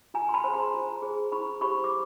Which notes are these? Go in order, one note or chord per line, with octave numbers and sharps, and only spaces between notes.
F4 G#5 A#5
C6
A5 B5
G#4 C5
A#5 C6
F4
G#4 C5
E4 B5 C#6
G4 C5 B5 C#6
D6